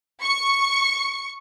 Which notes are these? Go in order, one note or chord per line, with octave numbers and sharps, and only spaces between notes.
C#6 C#7